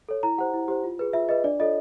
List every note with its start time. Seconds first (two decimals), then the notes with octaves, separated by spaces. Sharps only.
0.09 A4 C#5
0.23 E4 A#5
0.38 G4 C5 F#5
0.53 E4
0.68 G4 C5
0.84 F4
0.99 G#4 B4
1.13 F4 E5
1.28 G#4 B4 D#5
1.44 D4 D5
1.59 F4 A4 C#5 D#5